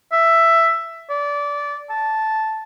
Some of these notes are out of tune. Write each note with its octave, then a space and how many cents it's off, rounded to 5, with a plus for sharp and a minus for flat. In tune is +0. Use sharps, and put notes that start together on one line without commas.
E5 +10
D5 -20
A5 -5